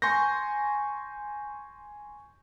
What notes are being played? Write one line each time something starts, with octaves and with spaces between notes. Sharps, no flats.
G#5 C6 C#6 G6 A#6